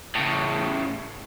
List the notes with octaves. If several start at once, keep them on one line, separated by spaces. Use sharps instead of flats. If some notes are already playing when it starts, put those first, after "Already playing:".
A2 C#3